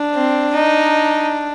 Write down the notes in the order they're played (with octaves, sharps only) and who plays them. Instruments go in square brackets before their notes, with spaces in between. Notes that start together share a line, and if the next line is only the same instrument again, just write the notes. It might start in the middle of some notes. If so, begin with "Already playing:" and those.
Already playing: [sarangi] D4
[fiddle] C4
D#4